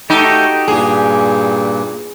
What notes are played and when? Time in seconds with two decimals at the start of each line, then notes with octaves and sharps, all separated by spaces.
0.10 A3 D#4 F#4 G4 A4
0.68 G2 A#2 A#3 G#4